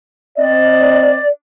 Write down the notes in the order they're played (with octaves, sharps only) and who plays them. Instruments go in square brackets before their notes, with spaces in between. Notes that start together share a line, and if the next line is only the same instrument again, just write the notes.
[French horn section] C4 D#5 [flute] D5